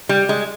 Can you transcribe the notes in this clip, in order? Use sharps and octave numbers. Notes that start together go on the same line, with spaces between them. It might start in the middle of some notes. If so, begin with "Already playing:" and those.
G3
G#3